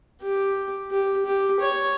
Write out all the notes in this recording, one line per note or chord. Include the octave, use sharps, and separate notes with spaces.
G4
G4
G4
C#5